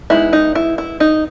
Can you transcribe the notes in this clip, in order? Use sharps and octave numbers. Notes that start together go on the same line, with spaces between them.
G#3 B3 D#4 E4
D#4
E4
E4
D#4